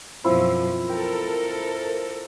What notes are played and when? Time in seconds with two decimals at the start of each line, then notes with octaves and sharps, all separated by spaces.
0.24 F#2 B2 F3 C4 E4 F4
0.89 A4 A#4 G5